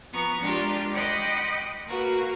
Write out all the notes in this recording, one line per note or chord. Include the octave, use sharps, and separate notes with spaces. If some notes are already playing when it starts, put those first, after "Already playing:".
F3 B3 A#5 C#6
G#3 D4 F4 G4 A#4
D#5 F#5 G5 B5 C6 D6
A#3 F#4 A#4 B4